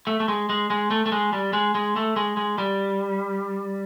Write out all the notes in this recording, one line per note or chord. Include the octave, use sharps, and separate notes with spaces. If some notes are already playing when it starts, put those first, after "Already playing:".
A3
A3
G#3
G#3
G#3
A3
A3
G#3
G3
G#3
G#3
A3
G#3
G#3
G3